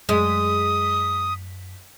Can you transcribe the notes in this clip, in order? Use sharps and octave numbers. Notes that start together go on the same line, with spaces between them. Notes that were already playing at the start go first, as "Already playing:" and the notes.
F#2 G#3 D#6 B6